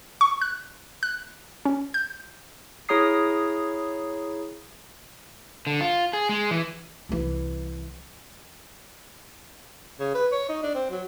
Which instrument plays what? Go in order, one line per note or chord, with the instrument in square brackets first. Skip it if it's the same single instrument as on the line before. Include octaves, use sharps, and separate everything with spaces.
[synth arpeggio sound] C#6
F#6
F#6
C#4
G6
[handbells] E4 G#4 C#5 A#5 D#6 C7
[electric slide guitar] D3
F4
G#4
G#3
E3
[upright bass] C2 E3
[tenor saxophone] C#3
B4
C#5
D#4
D4
C4
F#3